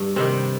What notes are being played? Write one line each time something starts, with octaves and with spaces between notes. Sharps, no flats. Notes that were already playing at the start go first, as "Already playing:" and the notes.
Already playing: G2
C3 D#3 G3 C4